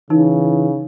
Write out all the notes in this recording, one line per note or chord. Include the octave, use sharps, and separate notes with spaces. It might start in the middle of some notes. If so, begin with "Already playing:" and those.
C#3 E3 D#4